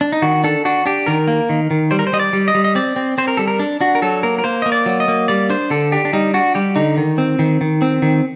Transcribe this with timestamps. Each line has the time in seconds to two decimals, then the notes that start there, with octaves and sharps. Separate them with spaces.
0.01 D4
0.12 D#4
0.22 D#3 F#4
0.44 D4 A4
0.65 D4 F#4
0.85 D4 G4
1.06 D#3 A#4
1.28 A#3
1.49 D#3
1.71 D#3
1.91 G3 C5
1.99 A#4
2.07 C5
2.13 G3 D#5
2.19 D5
2.33 G3
2.48 D#5
2.55 G3
2.64 D#5
2.75 C4 D5
2.96 C4
3.18 C4 C5
3.28 A#4
3.37 G3 A4
3.48 A#4
3.59 D4
3.81 D4 F#4
3.95 A#4
4.02 F#3 A4
4.23 A#3 A#4
4.38 A#4
4.44 A#3 C5
4.62 A#3 D#5
4.72 D5
4.86 F#3
5.00 D#5
5.08 A#3
5.28 G3 D5
5.50 D4 C5
5.70 D3 A4
5.92 D4 G4
6.05 D4
6.13 G3 D#4
6.34 D4 F#4
6.55 G3 G4
6.76 D3 D#4
6.97 D#3
7.18 C4
7.39 D#3
7.61 D#3
7.82 C4
8.02 D#3